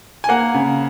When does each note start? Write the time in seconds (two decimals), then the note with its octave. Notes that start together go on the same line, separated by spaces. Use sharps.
0.24 G#5
0.29 A#3 F#5
0.54 C#3